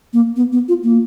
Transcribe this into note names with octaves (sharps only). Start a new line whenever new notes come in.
A#3
B3
B3
F4
A#3